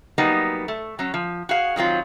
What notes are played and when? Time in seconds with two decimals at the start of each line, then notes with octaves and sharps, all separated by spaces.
0.18 F#3 G3 A#3 B3 D#4
0.68 A3
0.99 F#3 C#4
1.14 F3
1.49 F#4 G#4 F5
1.76 D#3 F#3 C4 F4